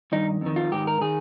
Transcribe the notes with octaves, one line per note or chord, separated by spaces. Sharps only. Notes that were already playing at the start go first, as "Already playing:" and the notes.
G2 D#3 D#4
F2 D#3
F4
G#2 D#3 G4
A#4
D#3 G#4